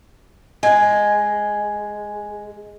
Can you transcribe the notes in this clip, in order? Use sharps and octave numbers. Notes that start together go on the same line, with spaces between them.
G#3 G#5 G#6